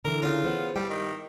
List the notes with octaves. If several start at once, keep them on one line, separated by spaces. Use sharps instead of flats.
D3 E3 A#4
C#3 C#4 F4
B3 C5 F#5
G2 G3 G5
D#3